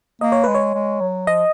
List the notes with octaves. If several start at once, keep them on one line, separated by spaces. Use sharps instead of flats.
A#3 D#5
C#5
G#3 B4
C#5
G#3
F#3
F3 D#5